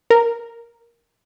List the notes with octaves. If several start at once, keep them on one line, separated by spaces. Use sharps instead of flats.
A#4